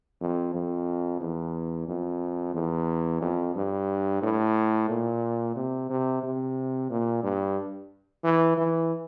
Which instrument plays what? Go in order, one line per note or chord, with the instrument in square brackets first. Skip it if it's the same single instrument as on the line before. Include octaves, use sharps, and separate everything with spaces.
[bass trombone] F2
F2
E2
F2
E2
F2
G2
A2
A#2
C3
C3
C3
A#2
G2
E3
E3